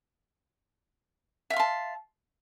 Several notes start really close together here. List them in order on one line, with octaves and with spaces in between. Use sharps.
E5 F5 C6 A5